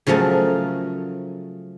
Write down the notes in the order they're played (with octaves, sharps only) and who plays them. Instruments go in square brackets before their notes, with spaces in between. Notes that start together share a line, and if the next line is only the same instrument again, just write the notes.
[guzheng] C#3 F3 F#3 A3 A#4